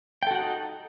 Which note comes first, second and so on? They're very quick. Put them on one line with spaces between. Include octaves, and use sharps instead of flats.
G5 A4 F#4 F#5 D#4